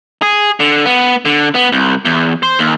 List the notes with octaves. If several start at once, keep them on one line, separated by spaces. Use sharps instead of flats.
G#4
D3
B3
D3
B3
C2
E2
C5
D#2